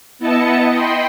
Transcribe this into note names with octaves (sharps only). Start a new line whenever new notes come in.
B3 E4 D#5 A5 C#7
D#5 G5 B5 C6